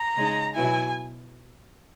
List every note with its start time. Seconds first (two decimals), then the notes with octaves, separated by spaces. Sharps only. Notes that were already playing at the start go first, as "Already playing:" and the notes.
Already playing: A#5
0.16 C#3 G#3 D#4
0.55 B2 F#3 B3 E4 G#5